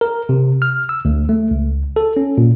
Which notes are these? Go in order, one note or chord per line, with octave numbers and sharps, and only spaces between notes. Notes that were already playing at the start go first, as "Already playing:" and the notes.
A#4
C3
F6
E6
D2
A3
C#2
A4
C#4
A#2